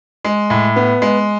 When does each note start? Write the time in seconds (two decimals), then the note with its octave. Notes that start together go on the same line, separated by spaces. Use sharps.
0.24 G#3
0.50 A2
0.76 B3
1.02 G#3